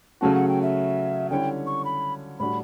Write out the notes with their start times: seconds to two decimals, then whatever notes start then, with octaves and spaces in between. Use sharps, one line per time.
0.21 C#3 F#3 A3 C#4 F#4 A5
0.35 F#5
0.48 G5
0.62 E5
1.30 D3 G3 C#4 E4 G5
1.66 C#6
1.85 B5
2.39 A2 G3 D4 F#4 B5